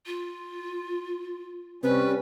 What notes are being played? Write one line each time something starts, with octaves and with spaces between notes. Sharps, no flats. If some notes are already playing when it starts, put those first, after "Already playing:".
F4
C3 G3 C#4 B4